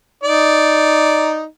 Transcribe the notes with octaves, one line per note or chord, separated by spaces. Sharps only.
D#4 D5